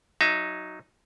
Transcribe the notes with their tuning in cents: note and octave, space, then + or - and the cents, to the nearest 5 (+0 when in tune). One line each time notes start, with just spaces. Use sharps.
F#3 +0 D#4 +0 E5 +25